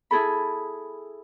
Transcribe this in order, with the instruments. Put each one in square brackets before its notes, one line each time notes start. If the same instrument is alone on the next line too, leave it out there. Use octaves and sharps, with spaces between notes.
[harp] E4 G#4 A4 B5